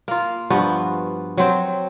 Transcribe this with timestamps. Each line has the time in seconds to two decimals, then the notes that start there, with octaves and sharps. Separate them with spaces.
0.08 A#3 F4
0.50 G2 F3 B3 F#4
1.37 F#3 C4